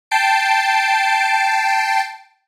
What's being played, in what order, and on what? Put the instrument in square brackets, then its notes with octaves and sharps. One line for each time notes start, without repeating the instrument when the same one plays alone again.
[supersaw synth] G5 A5 C7 D7